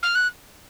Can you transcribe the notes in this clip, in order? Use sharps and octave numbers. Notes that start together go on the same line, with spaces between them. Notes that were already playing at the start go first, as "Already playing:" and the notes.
F6
F#6